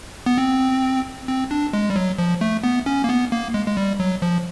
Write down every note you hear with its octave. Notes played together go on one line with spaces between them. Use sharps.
B3
C4
C4
D4
G#3
G3
F#3
F3
A3
B3
C#4
A#3
B3
A#3
G#3
G#3
G3
F#3
F3